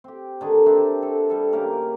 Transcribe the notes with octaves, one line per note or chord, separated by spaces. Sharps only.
C4 G4
D3 D#3 G#4
C4 D4 E4 G4
F#4 A4
G3 A4
C#3 A#3 G4 A#4